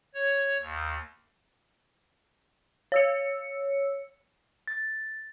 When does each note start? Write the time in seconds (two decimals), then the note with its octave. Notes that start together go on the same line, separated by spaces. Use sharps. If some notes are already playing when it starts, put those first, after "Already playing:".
0.14 C#5
0.60 D#2
2.92 C#5 E6 C#7
4.67 A6